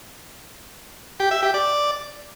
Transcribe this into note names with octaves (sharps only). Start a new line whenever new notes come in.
G4
E5
G4
D5